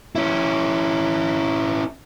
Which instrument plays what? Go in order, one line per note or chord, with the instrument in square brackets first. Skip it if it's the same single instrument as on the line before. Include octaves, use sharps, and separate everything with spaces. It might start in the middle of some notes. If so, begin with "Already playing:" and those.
[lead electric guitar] C#4 E4